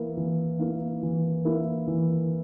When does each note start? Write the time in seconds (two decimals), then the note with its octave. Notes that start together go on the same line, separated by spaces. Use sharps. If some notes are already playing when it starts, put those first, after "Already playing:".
Already playing: E3 A#3 E4 A#4
0.17 E3
0.59 A#3 E4 A#4
1.03 E3
1.45 A#3 E4 A#4
1.87 E3